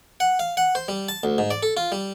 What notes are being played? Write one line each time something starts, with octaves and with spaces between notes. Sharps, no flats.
F#5
F5
F#5
C5
G3
A5
D2
G#2
D5
A4
F4
G3